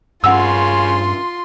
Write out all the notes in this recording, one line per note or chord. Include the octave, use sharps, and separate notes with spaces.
G2 C#3 C#4 F4 F#5 C6 E6